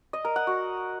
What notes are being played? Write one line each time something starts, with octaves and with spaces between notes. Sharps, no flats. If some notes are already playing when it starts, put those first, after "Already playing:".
D#5
A#4
F#5
F#4